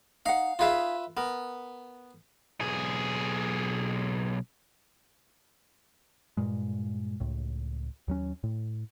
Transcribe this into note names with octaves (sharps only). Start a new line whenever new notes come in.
D#4 F5 F#5
D#4 F4 G#4 B4 E5 F5
B3 A#4
B1 G#4
G2 A#2 G#3
C#2 A2
D#2 F#3 C#4
A2